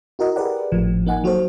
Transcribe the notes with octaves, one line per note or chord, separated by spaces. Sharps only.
E4 F#4 A#4 D#5
G4 G#4 A#4 B4 D5 F#5
G#1 A2 F3
A#3 D#4 F#5 G#5
F#3 F#4 A4 C5